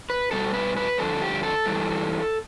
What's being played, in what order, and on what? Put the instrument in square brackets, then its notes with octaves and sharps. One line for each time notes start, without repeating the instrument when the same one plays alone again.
[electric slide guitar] B4
B2 G3 A4
B4
B4
G2 D3 F3 A4
G4
A4
G2 E3 G3